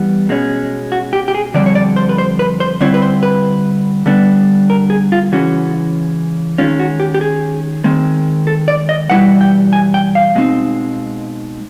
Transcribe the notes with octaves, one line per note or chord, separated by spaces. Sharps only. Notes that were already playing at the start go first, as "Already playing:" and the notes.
Already playing: E3 G3 B3
B2 G#3 C#4
F#4
G4
G4
G#4
F2 D3 G3 D5
C#5
D5
C5
B4
C5
B4
C5
D3 G3 C4 E4 C#5
B4
C5
B4
D3 G3 B3 D4
A#4
G#4
F4
C#3 E3 G#3 C#4 F#4
D#3 G#3 C#4 F4
F#4
G4
G4
G#4
D#3 G#3 C4
A4
D5
D#5
E2 B2 G3 B3 E4 F#5
G5
G#5
G5
F5
B2 G#3 C4 D#4